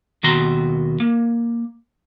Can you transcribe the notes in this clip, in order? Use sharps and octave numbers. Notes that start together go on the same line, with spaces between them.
D#2 B2 D#3 F#4 A#5 C6
A#3